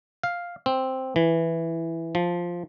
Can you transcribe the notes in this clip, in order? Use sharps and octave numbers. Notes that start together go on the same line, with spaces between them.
F5
C4
E3
F3